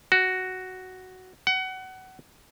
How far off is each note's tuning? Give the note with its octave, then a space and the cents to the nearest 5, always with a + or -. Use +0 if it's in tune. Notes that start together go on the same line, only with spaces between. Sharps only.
F#4 +5
F#5 +25